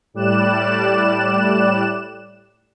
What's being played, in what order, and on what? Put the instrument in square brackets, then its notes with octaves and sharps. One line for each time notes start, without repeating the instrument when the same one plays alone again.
[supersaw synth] A2 G3 D5 F#6 E7